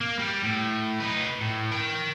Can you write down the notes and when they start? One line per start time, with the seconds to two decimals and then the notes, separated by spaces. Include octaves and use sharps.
0.01 A#3
0.19 G3
0.42 A2
1.00 D#4 B4
1.41 A2
1.71 A#4 G5